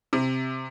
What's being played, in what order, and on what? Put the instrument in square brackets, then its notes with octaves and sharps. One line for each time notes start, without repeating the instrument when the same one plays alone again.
[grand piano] C3